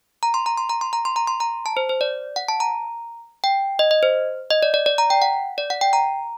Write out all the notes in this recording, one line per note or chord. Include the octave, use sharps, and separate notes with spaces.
A#5
C6
A#5
C6
A#5
C6
A#5
C6
A#5
C6
A#5
A5
C5
C5
D5
F#5
A5
A#5
G5
D#5
D#5
C5
D#5
D5
D5
D5
A#5
G5
F#5
D5
F#5
G5
A#5